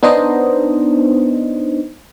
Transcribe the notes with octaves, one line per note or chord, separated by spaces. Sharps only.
B3 D4 D#4 C5 D#5